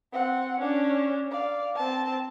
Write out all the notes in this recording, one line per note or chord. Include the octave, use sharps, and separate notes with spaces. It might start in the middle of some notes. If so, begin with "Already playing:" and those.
C4 F#5
C#4 D4
D5 F5
C4 A5